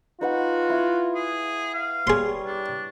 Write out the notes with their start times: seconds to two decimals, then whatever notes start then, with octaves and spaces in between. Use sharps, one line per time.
0.21 D#4 F4 F#4 B4 F#5
0.70 E4
1.14 G#4
1.74 F5
2.07 G3 G#4 C#5 C6
2.46 D4